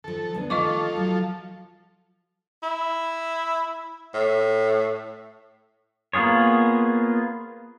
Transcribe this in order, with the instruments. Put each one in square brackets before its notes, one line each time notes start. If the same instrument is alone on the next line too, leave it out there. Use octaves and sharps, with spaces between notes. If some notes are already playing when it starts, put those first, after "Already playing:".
[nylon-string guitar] D#3 F3 [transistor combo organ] A4
[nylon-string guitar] D2 B3 D4
[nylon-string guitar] D#3 A3 [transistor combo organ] F3 A4 [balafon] D#5 C#6 D6
[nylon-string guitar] F#3
[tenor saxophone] E4
A2
[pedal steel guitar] A#3 B3 F4 G#4 C#5